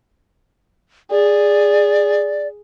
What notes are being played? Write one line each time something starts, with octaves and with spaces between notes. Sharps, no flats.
G#4 D5